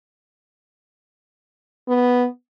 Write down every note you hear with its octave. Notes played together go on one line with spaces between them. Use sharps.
B3